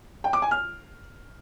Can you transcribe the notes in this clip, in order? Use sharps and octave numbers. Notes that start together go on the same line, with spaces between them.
G5
D6
G#5
F6